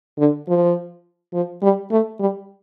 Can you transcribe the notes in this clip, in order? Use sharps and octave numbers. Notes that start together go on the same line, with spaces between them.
D3
F3
F3
G3
A3
G3